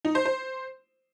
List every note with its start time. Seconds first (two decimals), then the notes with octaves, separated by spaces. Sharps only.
0.05 D#4
0.15 C5
0.25 C5